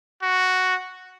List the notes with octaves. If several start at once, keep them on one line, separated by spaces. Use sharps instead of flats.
F#4